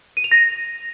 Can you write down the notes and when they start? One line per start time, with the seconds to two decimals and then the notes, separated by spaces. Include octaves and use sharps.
0.17 D#7
0.24 F7
0.32 A#6